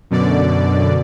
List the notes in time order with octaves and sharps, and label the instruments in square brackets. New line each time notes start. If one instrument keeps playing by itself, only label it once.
[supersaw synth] F#2 B2 D3 D5